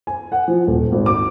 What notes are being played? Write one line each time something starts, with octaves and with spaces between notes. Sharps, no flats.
G#5
F#5
F3
D#1
G#1
D6